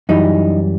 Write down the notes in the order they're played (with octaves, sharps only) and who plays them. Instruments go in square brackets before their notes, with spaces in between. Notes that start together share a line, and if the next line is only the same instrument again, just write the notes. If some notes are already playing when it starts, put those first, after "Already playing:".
[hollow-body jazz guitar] F#2 E3 G3 D#4